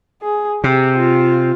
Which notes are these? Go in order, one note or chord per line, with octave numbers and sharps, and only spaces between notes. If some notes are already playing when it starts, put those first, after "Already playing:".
G#4
C3 G4
F4